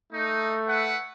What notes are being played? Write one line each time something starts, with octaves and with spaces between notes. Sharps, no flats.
A3 D#4
E4 B4 F#5